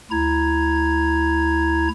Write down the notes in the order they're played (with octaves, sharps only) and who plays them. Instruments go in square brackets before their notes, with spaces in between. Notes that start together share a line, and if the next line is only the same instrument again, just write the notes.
[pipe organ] D2 E4 A#5 G#6